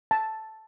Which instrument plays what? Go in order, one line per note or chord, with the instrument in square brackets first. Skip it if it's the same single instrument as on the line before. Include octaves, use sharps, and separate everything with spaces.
[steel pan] A5